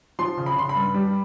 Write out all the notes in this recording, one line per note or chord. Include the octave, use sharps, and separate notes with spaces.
F3 C6
C#3
B5
C#3 C6
B5
G2
G3